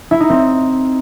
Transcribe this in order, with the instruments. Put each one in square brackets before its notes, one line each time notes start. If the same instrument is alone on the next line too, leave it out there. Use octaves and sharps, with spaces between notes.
[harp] E4
D#4
C4